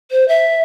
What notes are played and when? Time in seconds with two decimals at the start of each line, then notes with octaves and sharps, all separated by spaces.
0.11 C5
0.28 E5